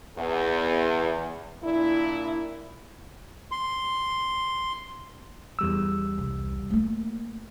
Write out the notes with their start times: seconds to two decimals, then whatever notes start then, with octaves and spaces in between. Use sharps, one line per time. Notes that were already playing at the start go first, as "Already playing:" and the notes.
0.17 E2
1.63 A#2 D4 E4
3.51 C6
5.59 E2 G3 E6
6.18 C2
6.70 A3 A#3